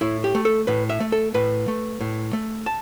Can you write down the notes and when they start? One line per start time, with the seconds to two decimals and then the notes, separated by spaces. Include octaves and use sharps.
0.01 A2 E4
0.24 G4
0.35 A3
0.45 A4
0.67 A2 B4
0.89 E5
1.00 A3
1.12 A4
1.34 A2 B4
1.68 A3
2.01 A2
2.33 A3
2.66 A5